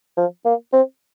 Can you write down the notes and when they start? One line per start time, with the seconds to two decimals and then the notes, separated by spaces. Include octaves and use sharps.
0.17 F3
0.45 A#3
0.73 C4